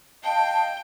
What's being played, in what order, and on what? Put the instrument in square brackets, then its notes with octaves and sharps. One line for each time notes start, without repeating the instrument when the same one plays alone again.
[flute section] D#5 F5 A5 [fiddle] G5